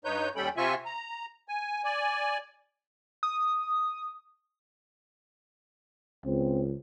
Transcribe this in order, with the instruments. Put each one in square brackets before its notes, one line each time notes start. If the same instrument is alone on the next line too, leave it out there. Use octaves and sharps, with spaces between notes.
[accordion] G2 D#4 B4 C#5 G6
D#2 G3 C#4 A4 G5 B5
C3 C4 F4 E5 G#5 C#6
A#5
G#5
D5 G#5
[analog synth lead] D#6
[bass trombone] C#2 [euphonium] C4